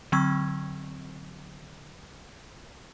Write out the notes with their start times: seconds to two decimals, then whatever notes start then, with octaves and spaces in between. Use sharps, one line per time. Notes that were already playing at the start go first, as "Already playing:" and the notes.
0.12 D3 F#3 C4 C#6 E6 G#6